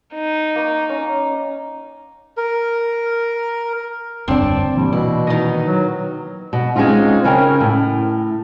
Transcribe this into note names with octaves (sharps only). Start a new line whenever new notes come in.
D#4
A#3 C#6
C#4 A#5
A#4
F1 D2 G2 C4 D4 D5 A5
A#2 E3 G3
B2 E4
D#3 B3 D#4 D#5
F#3
B2
G#3 C4 C#4 D#4 F4
C#3 C#4 A#4 G5 G#5
A2